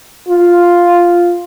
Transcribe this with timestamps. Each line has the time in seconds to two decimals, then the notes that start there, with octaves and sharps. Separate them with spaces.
0.28 F4